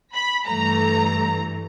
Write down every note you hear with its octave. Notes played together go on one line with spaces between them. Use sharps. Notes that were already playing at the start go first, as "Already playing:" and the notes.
B5
G2 E3 A3 A#5